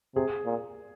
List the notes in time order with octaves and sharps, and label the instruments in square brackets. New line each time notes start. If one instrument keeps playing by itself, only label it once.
[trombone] C3 [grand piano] G#4
[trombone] A#2